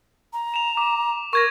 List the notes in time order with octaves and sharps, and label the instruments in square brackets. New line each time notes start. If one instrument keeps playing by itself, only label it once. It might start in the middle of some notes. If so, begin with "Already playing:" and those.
[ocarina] A#5
[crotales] E7 F7
D6
[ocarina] A#4 [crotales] C#6 G#6 A#6